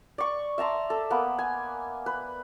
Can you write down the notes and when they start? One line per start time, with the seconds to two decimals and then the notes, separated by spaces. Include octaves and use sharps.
0.18 D5 C#6
0.58 E5 A5 A#5 C6
0.90 A4
1.10 A#3 B3
1.39 G#5
2.06 B4